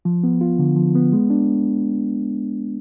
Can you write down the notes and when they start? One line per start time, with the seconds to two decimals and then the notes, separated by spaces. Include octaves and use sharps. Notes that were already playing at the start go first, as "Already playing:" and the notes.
0.05 F3
0.24 B3
0.41 F4
0.59 D3
0.76 F3
0.95 B3
1.13 G#3
1.30 D4